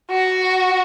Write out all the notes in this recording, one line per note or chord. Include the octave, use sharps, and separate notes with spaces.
F#4